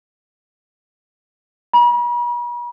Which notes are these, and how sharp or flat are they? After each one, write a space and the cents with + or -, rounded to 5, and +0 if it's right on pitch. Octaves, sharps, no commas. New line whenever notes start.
B5 -45